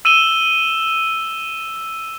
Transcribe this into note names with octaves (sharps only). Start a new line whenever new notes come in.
E6 D#7 E7 G7